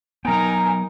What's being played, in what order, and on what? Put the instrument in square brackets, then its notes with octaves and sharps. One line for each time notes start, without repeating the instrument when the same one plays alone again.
[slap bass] F#3 B3 [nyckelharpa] D#4 A#4 [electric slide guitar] G5 A#5 [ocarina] G#5